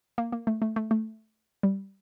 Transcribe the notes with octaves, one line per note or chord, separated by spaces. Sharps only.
A#3
A#3
A3
A3
A3
A3
G3